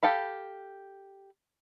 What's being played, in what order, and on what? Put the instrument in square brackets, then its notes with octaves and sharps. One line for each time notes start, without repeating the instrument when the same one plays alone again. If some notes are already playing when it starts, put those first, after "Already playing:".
[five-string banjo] G4 A4 F5 B5